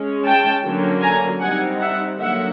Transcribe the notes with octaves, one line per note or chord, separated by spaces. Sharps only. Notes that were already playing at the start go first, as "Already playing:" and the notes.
Already playing: G#3 C#4
G5 A5
D3 F#3 A#3 C#4
G#5 A#5
G3 C4 D#4 F#5 G#5
E5 F#5
D3 F#3 A#3 D#4 E5 F#5